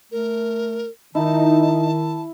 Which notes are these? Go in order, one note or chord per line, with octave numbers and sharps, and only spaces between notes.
A3 A#4
D#3 D#4 E4 A5